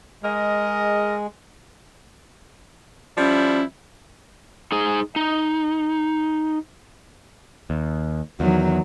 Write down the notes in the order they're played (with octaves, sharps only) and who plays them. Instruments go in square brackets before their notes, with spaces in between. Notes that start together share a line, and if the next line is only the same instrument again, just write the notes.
[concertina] G#3 [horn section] G#4 A#4 D#5
[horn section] F3 G3 E4 [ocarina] C#4
[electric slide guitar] D#4 G#4 G#5
D#4
[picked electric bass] D#2
[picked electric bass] E2 [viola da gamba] D#3 F#3